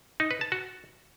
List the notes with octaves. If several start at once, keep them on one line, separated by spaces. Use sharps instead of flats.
D#4
B4
A5
F#4